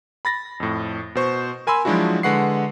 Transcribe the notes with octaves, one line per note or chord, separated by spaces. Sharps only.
B5 A6 A#6
F2 A2
B2 C5 C#6
A#4 G#5 B5 C6 E6
F3 F#3 G#3 D4 E4 F#4
D3 G#3 B4 F#5 C#6 C7